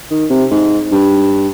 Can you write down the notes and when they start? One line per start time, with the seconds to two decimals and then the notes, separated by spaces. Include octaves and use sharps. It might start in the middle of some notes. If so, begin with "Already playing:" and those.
0.11 D#3
0.30 C3
0.51 G#2
0.92 G2